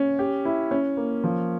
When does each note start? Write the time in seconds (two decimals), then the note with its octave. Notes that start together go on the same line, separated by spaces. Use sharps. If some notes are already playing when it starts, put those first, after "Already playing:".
Already playing: C#4
0.19 G4
0.45 E4
0.71 C#4
0.97 A#3
1.24 F3